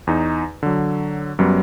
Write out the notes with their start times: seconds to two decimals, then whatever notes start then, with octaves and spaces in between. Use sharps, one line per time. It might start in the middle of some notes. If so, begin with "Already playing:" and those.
0.07 E2 D#4
0.63 D3 F#3
1.39 F#2 F#3 G3 B3